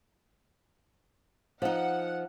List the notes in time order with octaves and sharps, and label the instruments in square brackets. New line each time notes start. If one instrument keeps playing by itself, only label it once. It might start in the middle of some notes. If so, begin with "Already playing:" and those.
[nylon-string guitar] F3 D#4 [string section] F#5